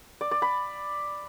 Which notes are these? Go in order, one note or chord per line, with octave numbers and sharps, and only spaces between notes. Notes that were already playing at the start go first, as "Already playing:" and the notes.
D5
D5
B5